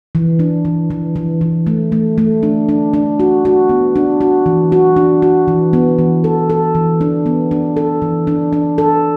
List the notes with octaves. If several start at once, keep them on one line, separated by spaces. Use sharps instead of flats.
E3
D4
E3
E3
E3
E3
A3
A3
A3
D4
D4
D4
F#4
F#4
B3
D4
F#4
E3
F#4
D4
F#4
E3
B3
E3
A4
A4
E3
D4
B3
D4
A4
E3
D4
D4
A4